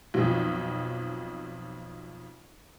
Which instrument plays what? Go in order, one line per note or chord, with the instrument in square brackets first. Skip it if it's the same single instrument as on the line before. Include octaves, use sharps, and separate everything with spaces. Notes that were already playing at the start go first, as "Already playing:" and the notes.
[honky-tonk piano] B1 F2